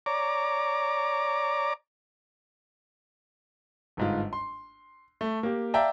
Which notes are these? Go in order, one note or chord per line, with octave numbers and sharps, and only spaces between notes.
C#5 D5 A#5 D6
G1 G#2 F4
C6
A3
A#3 G4
D5 E5 F5 G5 A5 A#5